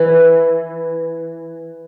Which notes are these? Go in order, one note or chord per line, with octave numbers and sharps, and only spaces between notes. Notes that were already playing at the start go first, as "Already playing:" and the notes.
Already playing: E3